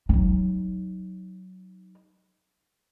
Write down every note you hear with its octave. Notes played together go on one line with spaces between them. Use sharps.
F#3 D#4